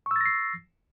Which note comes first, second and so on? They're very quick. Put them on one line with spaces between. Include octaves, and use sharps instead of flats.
C#6 E6 A6 A#6 C7